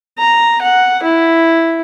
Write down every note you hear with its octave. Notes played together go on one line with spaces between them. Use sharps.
A#5
F#5
E4